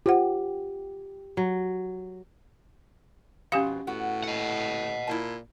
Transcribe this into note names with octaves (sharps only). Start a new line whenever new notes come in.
F4 G4 C5 F#5
F#3
F2 G#2 B2 C#4 G4 F5
A2 B3 F#4
D#5 F#5
A#2 E4 A5